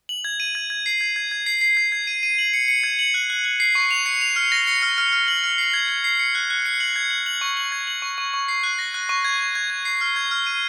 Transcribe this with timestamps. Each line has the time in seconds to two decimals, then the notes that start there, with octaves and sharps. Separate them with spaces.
0.09 F#7
0.25 G#6
0.40 D#7
0.55 G#6
0.70 G#6
0.86 C7
1.01 G#6
1.16 G#6
1.31 G#6
1.46 C7
1.61 C7
1.77 G#6
1.92 G#6
2.07 D#7
2.23 D#7
2.38 F#7
2.53 C#7
2.68 C#7
2.83 G#6
2.99 F#7
3.14 F#6
3.30 F#6
3.45 F#6
3.60 C7
3.75 C#6
3.91 F7
4.06 C#7
4.21 F7
4.36 F6
4.52 A#6
4.67 C#7
4.82 F6
4.98 F6
5.13 F6
5.28 F#7
5.44 F6
5.58 C7
5.74 G#6
5.89 G#6
6.04 C7
6.19 C#7
6.35 F#6
6.50 F#6
6.66 C#7
6.80 F#7
6.96 G#6
7.11 F#7
7.26 F#7
7.41 C#6
7.57 F#7
7.72 G#6
7.87 F#7
8.02 C#6
8.18 C#6
8.34 C#6
8.48 C7
8.63 F#6
8.79 A#6
8.94 F#6
9.09 C#6
9.24 G#6
9.39 G#6
9.55 G#6
9.70 G#6
9.85 C7
10.01 F6
10.16 G#6
10.31 F6
10.47 D#7